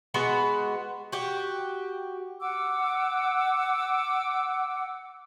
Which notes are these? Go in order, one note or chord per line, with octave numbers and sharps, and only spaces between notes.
G#3 B3 F#4 B4
F#4 G4
F#5 D6 E6